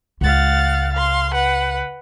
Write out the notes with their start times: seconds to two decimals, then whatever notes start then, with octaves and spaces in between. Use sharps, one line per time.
0.21 C#2 F5 F#5 A6
0.92 F5 C6
1.33 B4 F#5